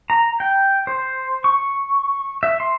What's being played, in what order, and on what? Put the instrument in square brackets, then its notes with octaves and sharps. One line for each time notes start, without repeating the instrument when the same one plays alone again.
[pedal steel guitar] A#5
G5
C5
C#6
E5
C6